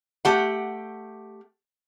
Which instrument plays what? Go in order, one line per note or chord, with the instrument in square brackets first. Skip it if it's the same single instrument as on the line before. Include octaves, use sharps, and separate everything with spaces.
[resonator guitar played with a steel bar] A3 G4 F#5